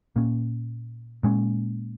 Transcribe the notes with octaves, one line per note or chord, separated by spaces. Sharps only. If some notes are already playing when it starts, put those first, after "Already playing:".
A#2 A#3 C#4
A#2 G#3 C#4